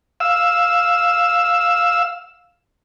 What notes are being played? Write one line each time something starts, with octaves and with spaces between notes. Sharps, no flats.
F5 E6